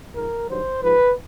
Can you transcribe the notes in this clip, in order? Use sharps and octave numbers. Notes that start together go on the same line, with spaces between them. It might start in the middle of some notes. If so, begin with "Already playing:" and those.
G#2 F3 A#4
G2 D#3 F#3 C5
G#2 F3 B4